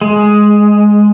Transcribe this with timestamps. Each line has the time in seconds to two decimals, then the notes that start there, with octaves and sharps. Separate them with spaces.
0.01 G#3